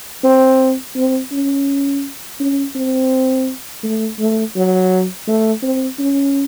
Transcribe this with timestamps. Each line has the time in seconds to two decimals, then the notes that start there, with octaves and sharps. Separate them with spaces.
0.24 C4
0.96 C4
1.32 C#4
2.40 C#4
2.75 C4
3.83 A3
4.19 A3
4.56 F#3
5.28 A3
5.63 C4
5.99 C#4